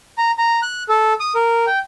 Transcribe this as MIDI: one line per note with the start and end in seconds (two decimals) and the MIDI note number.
0.18 0.31 82
0.38 0.60 82
0.62 0.83 90
0.89 1.13 69
1.20 1.33 87
1.35 1.65 70
1.67 1.79 79